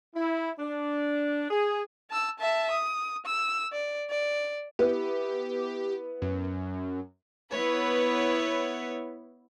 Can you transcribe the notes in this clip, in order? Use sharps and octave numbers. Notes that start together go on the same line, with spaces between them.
E4
D4
G#4
A5 E6
E5 A5
D#6
E6
D5
D5
B3 E4 G4 B4
F#2
B3 E4 B4 C#5